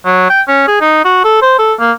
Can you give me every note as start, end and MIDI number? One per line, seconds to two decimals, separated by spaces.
0.05 0.30 54
0.30 0.41 79
0.48 0.63 61
0.68 0.78 68
0.81 1.01 63
1.04 1.24 66
1.24 1.39 69
1.42 1.54 72
1.59 1.73 69
1.79 1.92 58